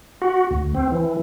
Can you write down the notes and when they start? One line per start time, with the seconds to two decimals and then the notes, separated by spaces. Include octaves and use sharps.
0.22 F#4
0.51 D2
0.75 C4
0.92 E3